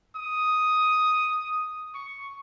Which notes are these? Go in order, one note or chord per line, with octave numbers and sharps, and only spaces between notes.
D#6
C#6